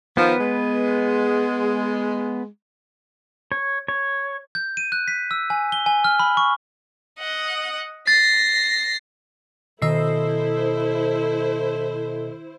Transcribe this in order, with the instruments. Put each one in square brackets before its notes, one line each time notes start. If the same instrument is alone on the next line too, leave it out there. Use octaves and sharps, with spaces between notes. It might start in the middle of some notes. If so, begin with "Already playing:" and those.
[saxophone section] D#3 F3 [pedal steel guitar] B3 B4
[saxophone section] G#3
[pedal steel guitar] C#5
C#5
[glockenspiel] G6
D#7
F#6
B6
E6
G#5
G7
G#5
F6
B5
C#6
[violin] D#5 F#5
[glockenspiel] A6 [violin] A#6 C7
[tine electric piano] B2 D#5 [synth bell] D#3 E6 C7 [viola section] E4 C5 [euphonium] A4